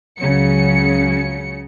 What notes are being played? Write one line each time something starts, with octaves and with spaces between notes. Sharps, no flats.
C#2 C#3 F#3 C#7